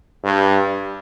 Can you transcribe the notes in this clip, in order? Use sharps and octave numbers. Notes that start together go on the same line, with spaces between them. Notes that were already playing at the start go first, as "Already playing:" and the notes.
G2